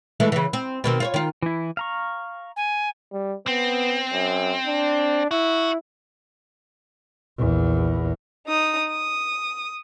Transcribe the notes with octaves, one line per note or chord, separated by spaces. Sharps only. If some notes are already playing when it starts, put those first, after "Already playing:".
E3 G#3 A3
C#3 E3
C4
B2 D#3 C4
F4 C5 C#5
D#3 F4
E3 E4
F5 A#5 C#6
G#5
G3
B3 C4
F#2
D4
E4 F#4
A#1 E2
D#4 D#6
D#6